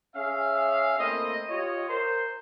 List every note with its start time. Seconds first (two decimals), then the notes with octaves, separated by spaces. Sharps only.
0.16 C#4 G#4 E5 F5
0.99 A3 A#3 C4 E4 D#5
1.49 F4 G4 C#5 D#5
1.89 A#4 C5